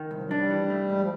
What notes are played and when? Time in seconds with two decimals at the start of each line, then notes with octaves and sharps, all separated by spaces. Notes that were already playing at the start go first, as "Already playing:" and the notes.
Already playing: D#3
0.11 C2 F3
0.22 F#3
0.31 G3 D4
0.50 E3
0.70 A3
0.90 G#2
1.01 F3